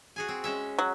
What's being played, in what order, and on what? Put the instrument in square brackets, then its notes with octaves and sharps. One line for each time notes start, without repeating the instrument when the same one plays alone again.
[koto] F#4 G#4 G#5
C4
G#3 C#4 E5
[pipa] F#3